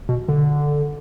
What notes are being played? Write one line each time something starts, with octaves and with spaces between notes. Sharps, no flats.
B2
D3